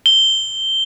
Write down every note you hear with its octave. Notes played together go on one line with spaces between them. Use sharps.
G7